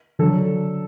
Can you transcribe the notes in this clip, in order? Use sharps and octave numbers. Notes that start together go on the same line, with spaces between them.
D3 F#3 A4